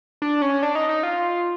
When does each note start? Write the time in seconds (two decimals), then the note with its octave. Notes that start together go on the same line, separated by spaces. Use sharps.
0.22 D4
0.42 C#4
0.63 D4
0.75 D#4
0.89 D#4
1.03 F4